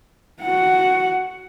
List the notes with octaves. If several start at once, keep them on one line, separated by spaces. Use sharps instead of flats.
F#4 F#5